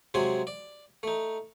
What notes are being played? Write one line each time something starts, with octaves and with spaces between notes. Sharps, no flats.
C3 F#3 G#3 G#5 C6
D5
A3 D#4